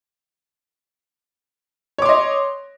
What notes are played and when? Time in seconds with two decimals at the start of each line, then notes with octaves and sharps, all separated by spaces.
1.98 C#5
2.02 D6
2.05 C6
2.09 D#5